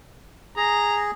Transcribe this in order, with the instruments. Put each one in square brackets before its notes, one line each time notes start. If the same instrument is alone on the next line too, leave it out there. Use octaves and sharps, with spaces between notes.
[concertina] G#4 [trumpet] A#5